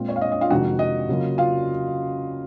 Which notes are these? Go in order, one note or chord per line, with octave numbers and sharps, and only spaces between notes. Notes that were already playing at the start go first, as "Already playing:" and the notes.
Already playing: A#2 G#3 C4 F4
C#5
F5
D#5
D#5
F4 F5
F2 C3 D#3 G#3 D#4 F#4 F#5
D#5
C#3 F#3 A#3 F4
F4 F5